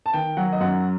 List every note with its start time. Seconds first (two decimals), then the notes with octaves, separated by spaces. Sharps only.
0.06 A5
0.13 D#3 G5
0.37 F#3 F#5
0.52 D#5
0.60 F#2 F#5